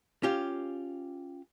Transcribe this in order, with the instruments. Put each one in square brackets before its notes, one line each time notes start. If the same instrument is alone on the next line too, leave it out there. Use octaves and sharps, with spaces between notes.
[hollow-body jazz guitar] C#4 F4 G4